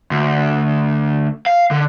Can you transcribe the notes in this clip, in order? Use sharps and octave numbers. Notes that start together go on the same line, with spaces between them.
D2
F5
D3